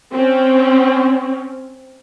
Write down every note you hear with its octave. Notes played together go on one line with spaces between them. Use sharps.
C4 C#4